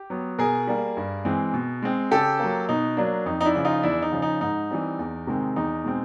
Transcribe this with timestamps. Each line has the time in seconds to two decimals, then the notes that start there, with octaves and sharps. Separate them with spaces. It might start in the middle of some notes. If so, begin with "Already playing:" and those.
Already playing: G4
0.10 F#3 B3
0.39 B2 G#4 A#4
0.68 G3 A#3
0.97 G2
1.25 E3 G#3 C4
1.54 B2
1.82 G#3 C4
2.11 C#3 G4 A4
2.39 F#3 A#3
2.69 B2 D#4
2.97 F#3 A#3 D4
3.26 F2 D#4
3.41 D#4
3.45 D4 E4
3.55 C#3 F3
3.65 D#4 F4
3.83 E2 D4 E4
4.02 D#4
4.12 C#3 F3
4.22 D#4
4.41 G#2 D#4
4.71 E3 G3 C4
4.99 E2
5.27 C3 D#3 G#3 C4
5.56 E2 D#4
5.84 B2 G#3 C4